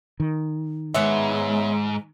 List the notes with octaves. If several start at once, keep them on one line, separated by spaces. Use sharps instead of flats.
D#3
G#2 G#3 B3 C#5 E5